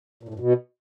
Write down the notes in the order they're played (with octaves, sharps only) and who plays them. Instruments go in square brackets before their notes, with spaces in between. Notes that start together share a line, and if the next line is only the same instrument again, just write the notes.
[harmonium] A#2
A2
G2
B2